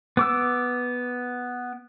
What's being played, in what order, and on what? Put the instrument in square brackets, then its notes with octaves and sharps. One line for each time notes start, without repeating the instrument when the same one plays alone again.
[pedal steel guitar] B3 D6 E6